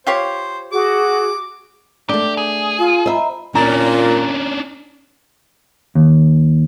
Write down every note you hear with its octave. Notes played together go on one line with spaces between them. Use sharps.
F4 G4 C5 C#5
F#4 G#4 D6
A3 D4 G4
G#4
F4
C5 D#5 E5 A#5 B5
A#2 C#4 D4 A#5 A6
D#2